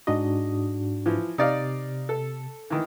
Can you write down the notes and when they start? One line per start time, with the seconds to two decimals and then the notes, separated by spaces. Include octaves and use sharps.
0.07 G#2 D4 F#4 D#5
1.06 E3 F3
1.38 C3 D#4 D5 F5
2.09 A4
2.70 D#3 E3